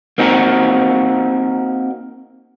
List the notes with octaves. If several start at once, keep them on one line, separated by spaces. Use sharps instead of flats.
A#3 C4 D#4 F#4 A#4